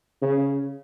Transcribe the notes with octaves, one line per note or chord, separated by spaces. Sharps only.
C#3